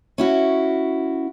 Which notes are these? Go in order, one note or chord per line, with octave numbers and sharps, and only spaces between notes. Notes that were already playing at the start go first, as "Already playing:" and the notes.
C#4 E4 F#4